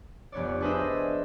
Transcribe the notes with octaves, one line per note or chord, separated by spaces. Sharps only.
F1 B3 C#5 D5
D4 G#4 B4 C5 D#5 E5